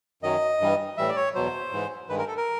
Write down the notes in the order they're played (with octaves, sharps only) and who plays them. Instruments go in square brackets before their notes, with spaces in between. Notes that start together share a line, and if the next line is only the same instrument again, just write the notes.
[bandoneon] F#2 D#3 F#3 D#5
G2 E3 G3
A2 E3 G3 E5
D5
C#5
E2 B2 F#3 C5
G#2 E3 G#3
G2 D#3 G#3 B4
A#4
A4
A#4